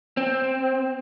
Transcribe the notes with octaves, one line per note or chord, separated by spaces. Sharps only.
C4